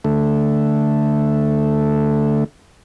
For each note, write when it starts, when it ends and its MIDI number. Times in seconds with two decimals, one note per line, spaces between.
0.05 2.44 50
0.05 2.44 57